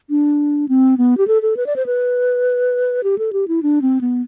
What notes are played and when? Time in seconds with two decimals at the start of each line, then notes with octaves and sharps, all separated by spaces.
0.10 D4
0.69 C4
0.98 B3
1.18 G4
1.28 A4
1.42 A4
1.57 B4
1.66 D5
1.76 C5
1.86 B4
3.04 G4
3.18 A4
3.33 G4
3.48 E4
3.63 D4
3.82 C4
4.01 B3